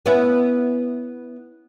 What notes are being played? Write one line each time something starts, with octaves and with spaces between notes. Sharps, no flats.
B3 C#4 E4